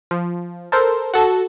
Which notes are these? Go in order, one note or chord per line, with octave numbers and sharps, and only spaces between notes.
F3
A4 A#4 C5
F#4 A4